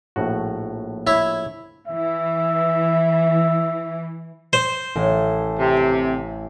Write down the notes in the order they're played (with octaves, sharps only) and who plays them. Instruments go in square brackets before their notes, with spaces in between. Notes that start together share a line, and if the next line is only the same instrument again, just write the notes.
[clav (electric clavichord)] A#1 A2 F#4
[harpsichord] E4 C#5
[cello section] E3 [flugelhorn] E5
[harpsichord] C5
[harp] A1
[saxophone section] C3